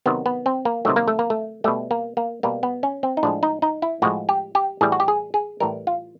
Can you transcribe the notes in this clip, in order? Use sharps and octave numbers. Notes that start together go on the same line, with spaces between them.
C3 D#3 F#3 B3
B3
C4
A#3
C3 D#3 F#3 A3
A#3
A3
A#3
A3
B2 G3 A3
A#3
A#3
B2 G3 A#3
B3
C#4
C4
D#4
A2 F3 G#3 D4
D#4
D#4
E4
A2 F3 G#3 F#4
G4
G4
A2 E3 G3 G#4
F#4
G4
G#4
G#4
A2 E3 G3 A#4
F4